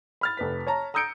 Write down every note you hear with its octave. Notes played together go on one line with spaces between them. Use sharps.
B5 F6 A6
F1 B4 B6
C#5 A5 A#5
A#5 D#6 E6 G6 C#7 D7